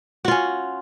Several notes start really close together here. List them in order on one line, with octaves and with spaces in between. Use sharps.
F#4 F4 C#4